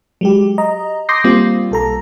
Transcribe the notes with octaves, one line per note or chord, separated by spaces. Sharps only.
F#3 G#3 G4
D#5 A#5
C6 D6 D#6 G6 A#6 C7
G3 A#3 C4 F4
B1 A4 A#5